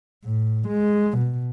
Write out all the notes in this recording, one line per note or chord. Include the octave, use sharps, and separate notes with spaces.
A2
G#3
B2